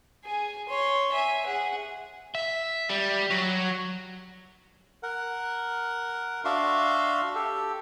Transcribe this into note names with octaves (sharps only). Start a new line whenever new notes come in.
G#4 G#5
C#5 C6
E5 G#5
G#4 F#5
E5
G3
F#3
A#4 F#5
D4 F#4 E5 F5 C6
G4 A4